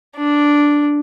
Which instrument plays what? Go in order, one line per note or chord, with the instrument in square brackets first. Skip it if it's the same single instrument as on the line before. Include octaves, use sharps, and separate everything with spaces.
[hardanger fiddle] D4